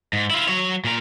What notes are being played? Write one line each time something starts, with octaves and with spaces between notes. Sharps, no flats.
G#2
E4 F4
F#3 C#5
A#2 A#4